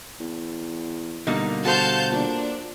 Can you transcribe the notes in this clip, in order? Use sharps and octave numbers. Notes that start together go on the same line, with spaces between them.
E2
B2 D3 G3 A#3 D#4
F#4 A4 C5 F5 A5 G6
A#2 D4